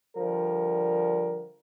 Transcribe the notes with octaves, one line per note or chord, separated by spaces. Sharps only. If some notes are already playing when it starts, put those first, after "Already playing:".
D3 F3 G3 A#4